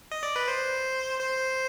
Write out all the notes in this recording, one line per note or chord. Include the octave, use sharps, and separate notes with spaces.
D#5
D5
B4
C5
C5